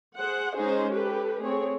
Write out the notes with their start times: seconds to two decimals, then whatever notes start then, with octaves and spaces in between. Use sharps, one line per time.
0.16 G#4 C5 F#5
0.55 G#3 C#4 D#4 G#4 C5
0.92 G4 A4 B4
1.39 A3 C4 G#4 C#5